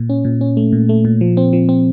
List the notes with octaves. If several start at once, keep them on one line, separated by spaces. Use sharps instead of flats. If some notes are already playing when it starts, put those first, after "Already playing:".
Already playing: A#2
C#4
A#2
C#4
A3
A#2
A3
A#2
F3
C4
F3
C4